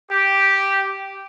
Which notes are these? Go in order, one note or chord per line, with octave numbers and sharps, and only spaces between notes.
G4